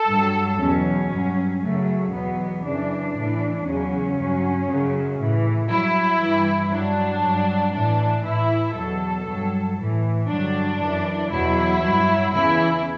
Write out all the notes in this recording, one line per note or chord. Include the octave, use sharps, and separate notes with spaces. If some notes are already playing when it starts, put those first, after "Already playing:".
Already playing: A4
G2 F#3
E2 B2 F#3 C#4
G2 F#3
F#2 C#3 F#3 A3
E2 B2 F#3 B3
F#2 C#3 E3 D4
A2 E3
E2 C#3 F#3 C#4
G2 F#3
F#2 C#3 F#3
A2 E3
G2 F#3 E4
G2 E3
G2 F#3 D4
G2 F#3
A2 E3 D4
A2 E3 E4
E2 B2 F#3 A4
G2 F#3
A2 E3
G2 D3 F#3 D4
F#2 E3
E2 B2 F#3 E4
G2 F#3
E2 C#3 E3 E4